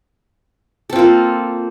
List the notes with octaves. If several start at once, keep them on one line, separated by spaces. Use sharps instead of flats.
A#3 C4 F4 A4